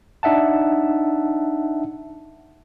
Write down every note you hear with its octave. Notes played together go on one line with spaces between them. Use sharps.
D4 D#4 E5 F#5 A5